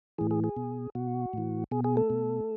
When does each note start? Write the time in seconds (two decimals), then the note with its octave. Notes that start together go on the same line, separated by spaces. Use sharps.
0.18 A2 E3 G#4
0.31 G#4
0.44 G#4
0.56 B2
0.95 B2 F#4
1.33 A2 E3
1.71 B2 G#4
1.84 G#4
1.97 A3 A4
2.10 B2